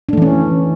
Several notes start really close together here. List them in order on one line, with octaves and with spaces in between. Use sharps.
D4 A3 E3 C#4